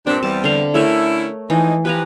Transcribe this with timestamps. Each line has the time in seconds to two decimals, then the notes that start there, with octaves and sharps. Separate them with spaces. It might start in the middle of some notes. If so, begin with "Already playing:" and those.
0.07 G2 A#2 C4 D4
0.23 E2 G3 A5
0.44 D3 F5
0.74 D3 A3 C#4 E4 A#4 C#5
1.50 E3 F3 G#3 D#4
1.85 F3 G4 B4 G#5 A#5